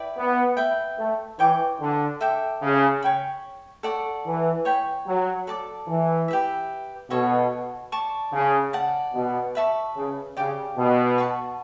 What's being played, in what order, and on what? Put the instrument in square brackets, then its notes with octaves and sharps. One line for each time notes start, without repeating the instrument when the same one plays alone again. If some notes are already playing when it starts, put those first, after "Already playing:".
Already playing: [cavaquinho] E4 B4 D5 G5
[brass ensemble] B3
[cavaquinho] B4 E5 G5
[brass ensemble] A3
[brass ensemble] E3 [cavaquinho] C#5 G5 D6
[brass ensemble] D3
[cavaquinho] A4 E5 G5 D6
[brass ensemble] C#3
[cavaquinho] C#5 G5 B5
A4 D5 F#5 C#6
[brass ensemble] E3
[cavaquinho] C#5 G5 B5
[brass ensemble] F#3
[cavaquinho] A4 D5 A5 D6
[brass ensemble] E3
[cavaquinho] G4 B4 E5
[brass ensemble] B2 [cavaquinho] F#4 A4 C#5
[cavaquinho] D5 A5 C#6
[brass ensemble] C#3
[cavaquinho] D5 F#5 A5
[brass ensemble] B2
[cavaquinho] B4 E5 A5 C#6
[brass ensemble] C#3
[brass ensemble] C#3 [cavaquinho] G4 D5 G5 D6
[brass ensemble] B2
[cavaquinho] B4 F#5 A5 C#6